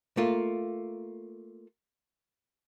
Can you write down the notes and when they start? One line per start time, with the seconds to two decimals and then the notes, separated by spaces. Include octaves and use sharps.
0.17 A3 A#3 F4